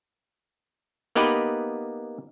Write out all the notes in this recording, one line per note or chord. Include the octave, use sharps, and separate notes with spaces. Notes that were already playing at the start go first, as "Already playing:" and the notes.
A#3 B3 D#4 G4 B4